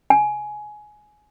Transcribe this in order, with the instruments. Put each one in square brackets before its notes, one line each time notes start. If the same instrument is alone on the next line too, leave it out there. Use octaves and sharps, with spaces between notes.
[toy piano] G#5